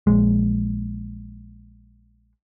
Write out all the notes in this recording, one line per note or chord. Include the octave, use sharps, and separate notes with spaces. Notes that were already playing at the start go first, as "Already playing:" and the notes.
A#1 G#3